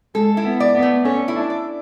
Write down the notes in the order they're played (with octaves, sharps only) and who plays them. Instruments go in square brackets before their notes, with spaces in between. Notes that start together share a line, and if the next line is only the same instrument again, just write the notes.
[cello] G#3 [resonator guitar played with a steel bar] A4
[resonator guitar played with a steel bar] E4
[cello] B3
[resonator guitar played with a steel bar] D5
[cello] B3
[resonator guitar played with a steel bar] A3
[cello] C#4 [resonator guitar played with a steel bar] A4
[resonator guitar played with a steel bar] E4
[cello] D4
[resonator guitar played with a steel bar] D5